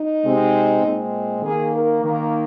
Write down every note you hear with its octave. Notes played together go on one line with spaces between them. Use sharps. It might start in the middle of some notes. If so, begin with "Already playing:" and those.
Already playing: D#4
C3 G#3 C4
A#2 G#3 C4
D#3 A#3 G#4
A#4
D#3 A#3 A#4